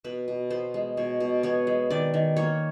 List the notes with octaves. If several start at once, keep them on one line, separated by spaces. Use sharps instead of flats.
B2 B4
B2
B3 C5
G#3
B2 C#5
B2
B3 C#5
G#3
D#3 D5
D#3
A#3 C#5